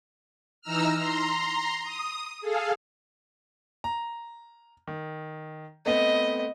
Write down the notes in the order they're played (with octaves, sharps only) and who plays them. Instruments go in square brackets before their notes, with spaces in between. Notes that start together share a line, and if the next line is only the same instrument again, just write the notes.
[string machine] E3 D#4 A#5 E6 F6
A#5 C6
D#6
G#4 A4 F5
[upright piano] A#5
D#3
[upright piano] A3 B3 C4 [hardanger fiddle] D#5